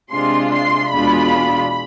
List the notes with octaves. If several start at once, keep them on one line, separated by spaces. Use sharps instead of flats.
C3 G#3 D4 F4 C6
C6
E2 B2 G#3 D4 F4 B5